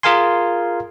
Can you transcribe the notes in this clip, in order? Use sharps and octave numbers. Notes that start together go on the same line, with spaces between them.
F4 G#4 A#4 F5 G#5 C6